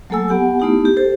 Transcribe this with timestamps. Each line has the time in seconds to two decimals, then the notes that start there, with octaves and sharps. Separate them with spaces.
0.10 F#3 A3 A#3 A4 G#5 E6
0.28 B3 G4 F#5 G#5
0.60 A3 B3 D#4 E4 G4
0.85 G4
0.97 G4 A4 C5